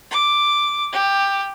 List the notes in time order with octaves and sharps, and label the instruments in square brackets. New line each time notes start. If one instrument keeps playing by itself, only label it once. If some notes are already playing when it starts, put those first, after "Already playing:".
[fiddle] D6
G4